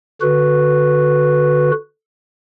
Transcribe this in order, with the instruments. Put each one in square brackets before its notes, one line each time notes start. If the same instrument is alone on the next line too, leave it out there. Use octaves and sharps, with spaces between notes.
[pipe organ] D3 F#4 B4